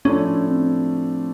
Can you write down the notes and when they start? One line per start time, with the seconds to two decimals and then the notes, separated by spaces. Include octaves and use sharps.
0.05 A2 F3 A3 C#4 D4
0.47 C4